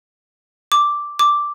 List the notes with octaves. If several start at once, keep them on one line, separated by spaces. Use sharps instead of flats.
D6
D6